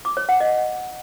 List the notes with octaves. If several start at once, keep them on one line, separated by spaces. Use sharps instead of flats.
D6
C#5
F#5
D#5